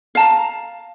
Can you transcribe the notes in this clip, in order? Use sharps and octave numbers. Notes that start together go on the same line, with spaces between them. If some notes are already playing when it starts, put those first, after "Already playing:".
F5 A5 A#5